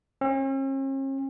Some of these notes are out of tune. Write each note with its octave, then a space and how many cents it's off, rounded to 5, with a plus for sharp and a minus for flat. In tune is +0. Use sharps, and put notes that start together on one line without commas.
C#4 -45